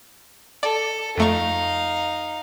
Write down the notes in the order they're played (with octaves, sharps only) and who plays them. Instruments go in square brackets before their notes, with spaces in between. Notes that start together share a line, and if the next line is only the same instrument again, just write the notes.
[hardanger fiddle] A4 [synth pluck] D5
[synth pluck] F2 A3 C#6 [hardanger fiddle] D#4 F5